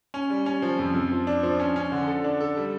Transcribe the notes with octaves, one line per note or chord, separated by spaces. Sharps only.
C#4
G3
C#4
F3
F2
F2
F3
D4
F3
C#4
C#4
D3
A4
D4
A4
G3